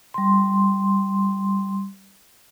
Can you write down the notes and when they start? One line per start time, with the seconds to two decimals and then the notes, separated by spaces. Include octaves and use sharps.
0.14 G3 C6